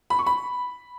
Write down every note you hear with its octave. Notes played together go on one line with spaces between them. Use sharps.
B5
C#6
B5